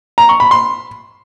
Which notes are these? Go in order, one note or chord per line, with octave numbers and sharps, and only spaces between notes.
A#5
C#6
B5
C6